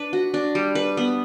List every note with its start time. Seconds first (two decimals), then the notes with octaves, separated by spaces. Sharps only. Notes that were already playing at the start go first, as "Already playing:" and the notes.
Already playing: D4 B4
0.13 F#4
0.34 D4
0.55 G3
0.75 B4
0.97 B3